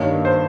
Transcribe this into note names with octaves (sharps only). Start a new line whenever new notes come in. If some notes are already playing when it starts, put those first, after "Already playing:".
Already playing: G2 D#3 A#3 D#4 C#5
C5